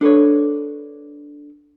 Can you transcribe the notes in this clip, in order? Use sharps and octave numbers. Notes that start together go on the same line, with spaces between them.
D4 A4 B4 C#5